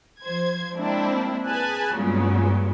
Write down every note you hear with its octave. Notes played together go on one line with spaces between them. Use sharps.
F3 C5 G#6
G#3 A#3 C4 D4 E4
G#4 B4 G#5 A5 F#6
G2 A#2 C#3 F#3 G#3 B3